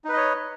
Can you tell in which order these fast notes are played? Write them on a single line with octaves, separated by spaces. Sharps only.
D#4 B4 D#5 C#5